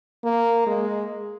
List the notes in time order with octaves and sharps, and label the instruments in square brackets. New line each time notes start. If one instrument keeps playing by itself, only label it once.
[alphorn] A#3
G#3